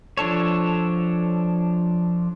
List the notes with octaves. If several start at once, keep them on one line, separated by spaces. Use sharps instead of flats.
F3 D4 A4 C#5